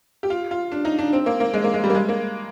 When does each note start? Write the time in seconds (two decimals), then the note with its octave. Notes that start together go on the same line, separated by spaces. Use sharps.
0.23 G4
0.30 F4
0.51 F4
0.72 D4
0.85 D#4
0.99 D4
1.13 C4
1.26 A#3
1.40 A#3
1.54 G#3
1.64 A#3
1.74 G#3
1.84 G3
1.90 A#3
1.95 G#3
2.09 A#3